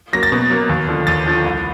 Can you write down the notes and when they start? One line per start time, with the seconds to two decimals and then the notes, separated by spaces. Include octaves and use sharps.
0.13 F#3 A#3 A#6
0.23 A6
0.32 B2
0.50 F#3 A#3
0.69 D#2
0.88 D3 F3
1.07 D#2 A6
1.26 D3 F3
1.44 C2